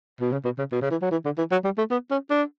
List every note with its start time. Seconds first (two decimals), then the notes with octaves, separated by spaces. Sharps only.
0.21 B2
0.32 C#3
0.45 B2
0.59 C#3
0.72 B2
0.82 C#3
0.91 E3
1.02 F#3
1.11 E3
1.25 D3
1.38 E3
1.52 F#3
1.65 G3
1.78 A3
1.91 B3
2.11 C#4
2.31 D4